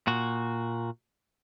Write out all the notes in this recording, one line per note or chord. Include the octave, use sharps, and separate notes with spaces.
A#2 F#4